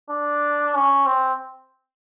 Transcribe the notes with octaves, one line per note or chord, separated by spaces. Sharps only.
D4
C#4
C4